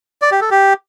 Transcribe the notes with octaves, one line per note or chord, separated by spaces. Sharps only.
D5
G4
A4
G4